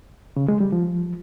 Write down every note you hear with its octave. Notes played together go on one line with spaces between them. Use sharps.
C#3
G#3
G3
F3